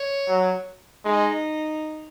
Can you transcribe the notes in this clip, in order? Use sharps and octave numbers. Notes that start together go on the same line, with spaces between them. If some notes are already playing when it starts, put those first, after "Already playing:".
Already playing: C#5
F#3
G#3 D#4